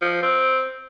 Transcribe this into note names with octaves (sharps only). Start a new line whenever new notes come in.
F3
C4